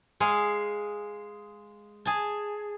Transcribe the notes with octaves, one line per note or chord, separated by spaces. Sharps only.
G#3 G#4 F5
G#4 A5